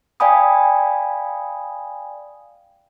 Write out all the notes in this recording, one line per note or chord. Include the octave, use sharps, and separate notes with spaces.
D5 F5 G5 G#5 B5 D#6